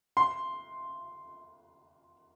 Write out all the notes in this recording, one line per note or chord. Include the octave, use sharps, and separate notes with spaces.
C6